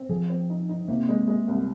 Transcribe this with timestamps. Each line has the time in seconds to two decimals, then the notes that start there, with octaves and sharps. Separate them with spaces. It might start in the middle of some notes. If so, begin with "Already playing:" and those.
Already playing: C4
0.09 F3 G#4
0.30 C4
0.50 D#4
0.69 D#4
0.88 C3 A#3
1.09 G#3
1.28 G#3
1.48 C2